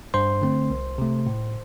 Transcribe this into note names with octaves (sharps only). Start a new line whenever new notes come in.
G2 C5 C6
D3 A3 C4
C2
C3 A3
A2